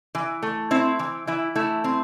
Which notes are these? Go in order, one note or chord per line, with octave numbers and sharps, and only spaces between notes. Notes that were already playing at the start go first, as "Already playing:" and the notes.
E3
A3
C4 E4
E3
E3 E4
A3 E4
C4